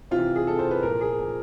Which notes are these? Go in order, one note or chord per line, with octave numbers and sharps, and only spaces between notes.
C3 E3 F4
G#4
C3 E3 A4
C5
B4
A#2 F3 A#4
G#4
A#2 F3